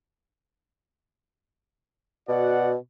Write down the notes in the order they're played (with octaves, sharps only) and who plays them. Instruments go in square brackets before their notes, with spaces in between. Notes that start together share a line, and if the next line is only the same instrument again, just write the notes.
[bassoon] B2 [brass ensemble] F#4 D5 F#5